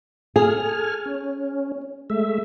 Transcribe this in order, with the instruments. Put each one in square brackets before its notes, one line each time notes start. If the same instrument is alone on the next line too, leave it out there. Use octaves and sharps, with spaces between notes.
[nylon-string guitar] G#4 [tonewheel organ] A4 G#5 F6
[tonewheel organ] C#4
G#3 A3 E5